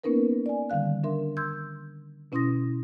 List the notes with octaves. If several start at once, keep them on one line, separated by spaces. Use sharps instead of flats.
A#3 B3 C#4 D#4 A#4 B4
D5 G#5
D3 D#3 G3 F5 F#6
D4 A#4 E5 C6
C6 E6 G6 G#6
B2 C#4 E4 C6 D#6 A#6